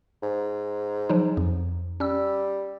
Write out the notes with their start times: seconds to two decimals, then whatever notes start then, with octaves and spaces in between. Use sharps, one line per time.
0.23 G#2
1.09 F3 F#3 D#4
1.37 F2
2.00 G3 C#4 E6